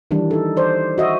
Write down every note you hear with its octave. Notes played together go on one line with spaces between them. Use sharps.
D#3 E3 G3 D4
D#4 A4
C5 D5
F#4 D#5 E5